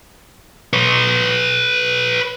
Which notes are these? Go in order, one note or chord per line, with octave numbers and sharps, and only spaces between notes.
B4 C#5